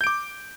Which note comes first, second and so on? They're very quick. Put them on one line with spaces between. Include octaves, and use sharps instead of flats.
G6 D7 D6